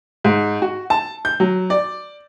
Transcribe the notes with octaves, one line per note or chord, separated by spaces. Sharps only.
G#2
F#4
A5
G6
F#3
D5